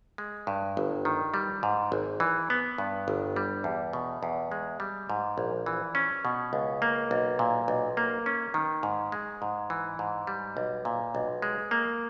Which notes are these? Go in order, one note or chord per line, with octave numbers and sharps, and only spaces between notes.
G#3
G2
G1
D#3
G3
G#2
G#1
E3
B3
G2
G1
G3
E2
B2
E2
G#3
G3
G#2
A#1
E3
C#4
B2
C#2
A#3
B1
A#2
B1
A#3
C#4
D#3
G#2
G#3
G#2
E3
G#2
G3
B1
A#2
B1
G#3
A#3